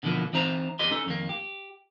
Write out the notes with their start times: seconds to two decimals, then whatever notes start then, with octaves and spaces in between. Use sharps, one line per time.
0.03 B2 D3 E3 F3 A#3 B3
0.33 E3 C4 D#4 C5 A#5
0.79 E2 G4 B4 D#5 C6
0.91 C#4 D#4 A4
1.06 F2 D#3 A#3
1.29 G4